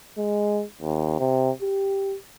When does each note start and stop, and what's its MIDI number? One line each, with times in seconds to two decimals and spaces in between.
0.18 0.64 56
0.81 1.16 39
1.20 1.50 48
1.62 2.16 67